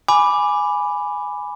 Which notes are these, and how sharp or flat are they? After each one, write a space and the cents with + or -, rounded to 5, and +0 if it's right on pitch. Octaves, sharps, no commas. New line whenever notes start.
G#5 +0 B5 +0 D6 +0